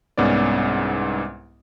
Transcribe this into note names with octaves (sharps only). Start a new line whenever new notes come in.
C2 G#2 B3 C#4 D5